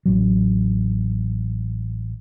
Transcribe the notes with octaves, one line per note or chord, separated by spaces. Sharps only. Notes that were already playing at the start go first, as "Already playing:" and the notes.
A1 F#3